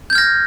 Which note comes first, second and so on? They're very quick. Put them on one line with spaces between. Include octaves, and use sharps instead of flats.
G6 G#6 F6 A#6